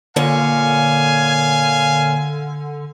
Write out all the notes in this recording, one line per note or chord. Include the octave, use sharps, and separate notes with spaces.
A#2 D3 C#5 F5 G#5